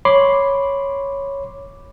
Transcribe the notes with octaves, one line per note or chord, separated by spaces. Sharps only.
C#5 B5 C6 D6 C7